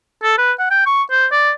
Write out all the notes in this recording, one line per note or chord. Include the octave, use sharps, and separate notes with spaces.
A4
B4
F#5
G5
C#6
C5
D5